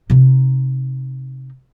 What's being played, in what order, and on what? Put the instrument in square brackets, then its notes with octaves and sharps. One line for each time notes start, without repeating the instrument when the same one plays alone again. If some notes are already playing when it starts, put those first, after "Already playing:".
[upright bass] C3 D#4